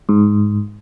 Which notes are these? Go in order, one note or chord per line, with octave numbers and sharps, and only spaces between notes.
G#2